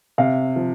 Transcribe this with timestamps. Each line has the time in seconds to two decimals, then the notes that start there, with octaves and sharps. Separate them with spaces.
0.18 C3 F5
0.56 F3